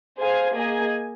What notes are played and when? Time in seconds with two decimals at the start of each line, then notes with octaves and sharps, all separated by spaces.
0.18 G#4 C5 F5 G#5
0.55 A#3 G#4 D#5 G#5